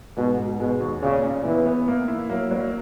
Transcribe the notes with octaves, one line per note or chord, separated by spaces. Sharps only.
G#2 B2
G#2
B2 G#3
D#2
A#2 C#3
A#2
E3 B3
B3
A#3
E4
F#3 A#3
F#3